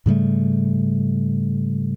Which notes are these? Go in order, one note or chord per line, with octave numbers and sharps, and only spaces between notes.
G#2 C#3 G3 A3